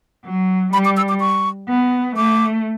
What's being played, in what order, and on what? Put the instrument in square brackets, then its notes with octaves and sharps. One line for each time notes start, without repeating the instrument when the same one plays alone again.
[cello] F#3
[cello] G3 [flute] B5
[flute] D6
E6
D6
C#6
[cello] B3
[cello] A3 [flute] D6